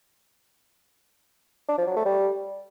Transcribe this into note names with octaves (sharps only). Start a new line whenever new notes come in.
D4
F3
F#3
A3
G3